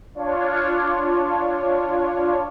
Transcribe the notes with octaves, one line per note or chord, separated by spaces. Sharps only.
D4 F4 C#5